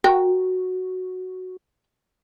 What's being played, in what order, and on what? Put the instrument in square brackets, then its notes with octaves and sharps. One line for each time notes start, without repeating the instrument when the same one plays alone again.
[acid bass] F#4 [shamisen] A#4 G5